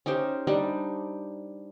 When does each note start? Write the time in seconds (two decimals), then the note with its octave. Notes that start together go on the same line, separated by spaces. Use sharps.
0.06 C#4 D#4 G4 C5
0.47 G3 D4 D#4 G4